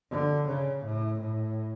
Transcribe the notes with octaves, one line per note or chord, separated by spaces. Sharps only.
D3
C#3
A2
A2